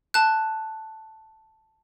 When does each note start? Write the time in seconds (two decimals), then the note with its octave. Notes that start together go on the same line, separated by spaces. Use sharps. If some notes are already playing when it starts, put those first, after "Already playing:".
0.14 A5 F#6